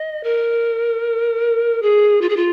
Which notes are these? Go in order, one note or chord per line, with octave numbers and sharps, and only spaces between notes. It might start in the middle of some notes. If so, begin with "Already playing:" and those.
Already playing: D#5
A#4
G#4
F4
G#4
F4